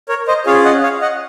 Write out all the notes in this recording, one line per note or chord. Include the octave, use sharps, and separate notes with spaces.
A#4 C#5
C5 D#5
C#4 F4 G#4 C#5 F5
D#5 F#5
C#5 F5
D#5 F#5